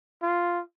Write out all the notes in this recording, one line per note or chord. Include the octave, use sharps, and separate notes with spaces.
F4